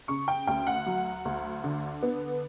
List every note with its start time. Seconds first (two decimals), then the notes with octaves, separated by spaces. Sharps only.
0.08 C#3 C#6
0.28 G5
0.47 D2 G5
0.67 F#5
0.86 F#3
1.25 D2
1.64 D3
2.03 B3